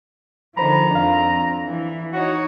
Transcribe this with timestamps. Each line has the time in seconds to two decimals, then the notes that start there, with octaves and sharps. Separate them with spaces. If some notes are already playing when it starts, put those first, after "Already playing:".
0.57 D3 D#3 F3 C5 A#5 B5
0.91 F2 C4 D4 F5
1.69 E3
2.13 D#4 F#4 C#5